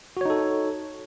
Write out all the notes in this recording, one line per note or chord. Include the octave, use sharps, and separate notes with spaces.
D#4 F#4 A4 C#5